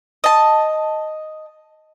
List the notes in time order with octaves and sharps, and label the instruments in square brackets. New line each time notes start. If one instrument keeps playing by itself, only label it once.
[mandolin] D#5 A5